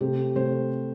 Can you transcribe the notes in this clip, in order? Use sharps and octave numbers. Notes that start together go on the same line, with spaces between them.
C3 A3 C4 G4
C3 A3 C4 C5